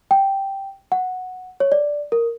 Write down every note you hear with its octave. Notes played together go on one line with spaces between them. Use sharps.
G5
F#5
C#5
D5
A#4